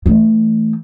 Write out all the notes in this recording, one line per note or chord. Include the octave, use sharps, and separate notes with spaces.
E3 A3